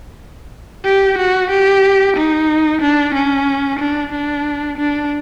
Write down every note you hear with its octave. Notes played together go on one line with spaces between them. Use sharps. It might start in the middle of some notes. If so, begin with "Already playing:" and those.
G4
F#4
G4
D#4
D4
C#4
D4
D4
D4